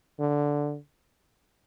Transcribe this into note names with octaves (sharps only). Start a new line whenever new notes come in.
D3